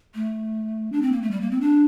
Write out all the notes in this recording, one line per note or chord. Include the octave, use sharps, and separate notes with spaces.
A3
D4
C4
A#3
A3
G3
A#3
C4
D4